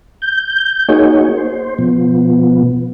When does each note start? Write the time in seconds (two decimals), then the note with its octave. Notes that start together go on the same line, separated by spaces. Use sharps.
0.22 G6
0.89 A#3 D#4 F#4 G#4 C#5
1.37 C5
1.78 B2 F3 B3